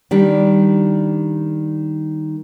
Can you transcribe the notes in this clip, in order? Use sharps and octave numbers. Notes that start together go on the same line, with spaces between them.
D#3 G3 D4